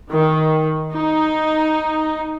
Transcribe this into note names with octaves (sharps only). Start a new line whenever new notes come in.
D#3
D#4